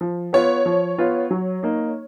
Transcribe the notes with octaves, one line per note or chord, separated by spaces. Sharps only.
F3
B3 F4 C#5
F3
B3 F4
F#3
A#3 D#4